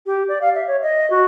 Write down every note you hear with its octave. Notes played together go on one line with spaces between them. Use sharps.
G4
D5
F5
E5
C#5
D#5
F#4